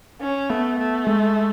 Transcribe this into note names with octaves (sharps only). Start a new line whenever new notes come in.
C#4
A3 B3
A3
G#3